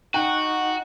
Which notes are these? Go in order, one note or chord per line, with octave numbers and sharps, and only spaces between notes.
D#4 F#4 F#5 G5